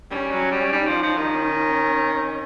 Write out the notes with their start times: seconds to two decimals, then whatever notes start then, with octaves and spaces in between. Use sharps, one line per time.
0.11 G3 C#4
0.31 F#3
0.51 G3
0.73 G3 D#4
0.88 F3
1.03 F3
1.18 D#3
1.34 C#4